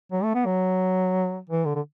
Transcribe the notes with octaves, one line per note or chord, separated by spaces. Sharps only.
F#3
A3
B3
F#3
E3
D3
D3